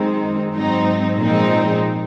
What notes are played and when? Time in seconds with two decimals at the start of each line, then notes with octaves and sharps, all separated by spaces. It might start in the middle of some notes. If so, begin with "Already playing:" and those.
Already playing: F#2 D#3 G#3 C4 D#4
0.52 G#2 F#3 C4 D#4
1.19 A#2 F3 G#3 C4 D#4